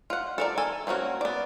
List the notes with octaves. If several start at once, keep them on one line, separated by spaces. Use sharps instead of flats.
F4 F#5
A4 A#4 D5
A4 G#5
A#3 C4 C#4 F#4
B3 D5